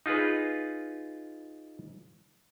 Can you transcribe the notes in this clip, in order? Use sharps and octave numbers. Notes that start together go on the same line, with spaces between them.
D#4 F4 G#4 B4